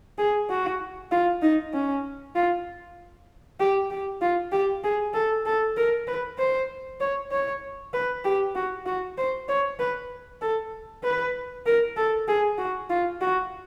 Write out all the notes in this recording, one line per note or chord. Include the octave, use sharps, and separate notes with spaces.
G#4
F#4
F4
D#4
C#4
F4
G4
G4
F4
G4
G#4
A4
A4
A#4
B4
C5
C#5
C#5
B4
G4
F#4
F#4
C5
C#5
B4
A4
B4
A#4
A4
G#4
F#4
F4
F#4